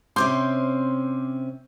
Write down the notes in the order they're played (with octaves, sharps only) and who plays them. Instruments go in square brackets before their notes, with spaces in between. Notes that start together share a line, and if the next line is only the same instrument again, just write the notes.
[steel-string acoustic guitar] C3 C4 C#4 [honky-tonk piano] C6 D6 G6